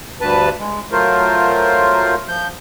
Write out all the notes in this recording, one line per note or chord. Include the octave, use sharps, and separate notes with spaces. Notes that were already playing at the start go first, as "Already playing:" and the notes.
D2 G2 B4 A5
G#3
F#3 A3 F4 A#4 C5
F3 G6